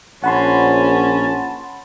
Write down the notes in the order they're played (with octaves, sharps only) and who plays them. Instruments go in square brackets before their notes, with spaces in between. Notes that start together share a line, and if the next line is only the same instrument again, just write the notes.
[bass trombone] A#1 [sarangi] C#4 [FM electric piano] F#5 B5 C6 [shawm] A5